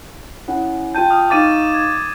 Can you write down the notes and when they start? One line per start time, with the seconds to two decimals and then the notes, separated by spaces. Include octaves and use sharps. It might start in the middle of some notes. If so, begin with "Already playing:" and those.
0.48 C#4 E4 F#5
0.95 F4 G5 A5 G6 D#7
1.11 D#6 F6
1.30 D#4 F5 C#6 D6 A6 D#7
1.74 G#6